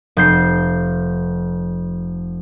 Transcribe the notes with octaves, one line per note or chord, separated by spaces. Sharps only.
F1 G6 C7